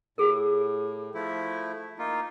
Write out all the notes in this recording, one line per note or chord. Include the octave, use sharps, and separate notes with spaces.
A2 G4 G#4 A#4
F3 A3 E4
A#3 D#4 F4